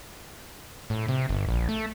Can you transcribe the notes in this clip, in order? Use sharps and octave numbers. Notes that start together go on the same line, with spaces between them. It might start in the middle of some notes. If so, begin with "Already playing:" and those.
A2
C3
G1
A#1
A3